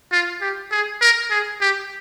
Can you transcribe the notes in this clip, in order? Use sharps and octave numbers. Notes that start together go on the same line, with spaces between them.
F4
G4
G#4
A#4
G#4
G4